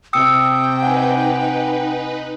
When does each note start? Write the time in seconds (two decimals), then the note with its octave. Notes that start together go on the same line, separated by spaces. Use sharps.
0.13 C3 G5 D#6 E6 C#7
0.83 D#4 B4 F#5 G#5